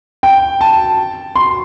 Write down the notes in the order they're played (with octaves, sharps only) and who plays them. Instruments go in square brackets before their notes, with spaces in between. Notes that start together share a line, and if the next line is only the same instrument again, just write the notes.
[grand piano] G5
A5
C6